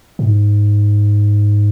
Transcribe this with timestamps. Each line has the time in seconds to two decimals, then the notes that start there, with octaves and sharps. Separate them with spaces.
0.19 G#2